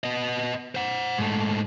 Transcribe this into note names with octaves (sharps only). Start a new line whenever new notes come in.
B3 D#5
C5 F#5
G#2 A3